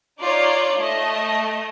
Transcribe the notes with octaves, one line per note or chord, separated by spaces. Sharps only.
D#4 F4 C#5 D5
A3 D#5